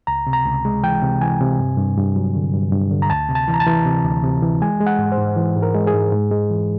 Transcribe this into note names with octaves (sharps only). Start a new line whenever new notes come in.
C#2 A#5
C3
A#5
C#2
G#3
E3 G5
C3
E3 G#5
C3
G2
G2
G2
F#3
D3
G2
G2
D3
A#5
D2 A5
C3
A5
E3
A#5
A5
E3
C3
D2
C3
E3
G#3 G#5
G#3
F#5
G#2
C5
G#2
E3
G#2
A#4
G#3
G#4
G#2
G#2
G#3
E3